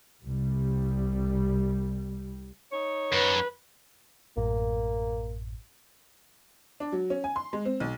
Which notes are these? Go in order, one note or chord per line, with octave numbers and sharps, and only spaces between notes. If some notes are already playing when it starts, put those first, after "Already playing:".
C2 G3
D#4 C#5
F#2 B4
A1 F#2 A2 A#3
D4
F#3
C#4
G#5
C6
G#3
C4
B1